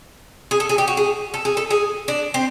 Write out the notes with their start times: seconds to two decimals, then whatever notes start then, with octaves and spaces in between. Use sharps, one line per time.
0.51 G#4
0.60 A4
0.69 G#4
0.78 G4
0.88 F#4
0.97 G#4
1.34 A4
1.45 G#4
1.57 A4
1.71 G#4
2.08 D4
2.34 C4